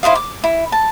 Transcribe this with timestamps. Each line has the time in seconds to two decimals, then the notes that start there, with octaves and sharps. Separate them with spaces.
0.03 E4 C5 D#5 F5
0.15 D6
0.44 E4
0.72 A5